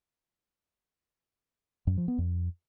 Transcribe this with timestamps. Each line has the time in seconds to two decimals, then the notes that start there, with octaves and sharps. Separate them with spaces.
1.87 F#2
1.97 F3
2.08 B3
2.18 F2